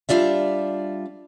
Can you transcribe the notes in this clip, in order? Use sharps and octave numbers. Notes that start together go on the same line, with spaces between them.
G3 D4 F4 D5 E5